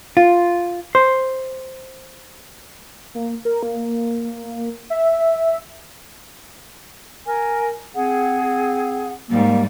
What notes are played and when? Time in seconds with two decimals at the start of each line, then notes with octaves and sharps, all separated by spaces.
0.17 F4
0.95 C5
3.15 A#3
3.45 A#4
3.63 A#3
4.90 E5
7.27 A#4 G#5
7.95 C4 G#4 F#5
9.29 G#2 G3 A#3